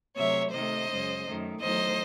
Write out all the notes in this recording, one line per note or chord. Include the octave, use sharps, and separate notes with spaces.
C3 F#3 A3 C#5 E5
C3 D#3 A3 C5 D#5
F#2 C#3 G#3
F#2 D#3 A3
E2 D#3 F#3 A3 C5 D#5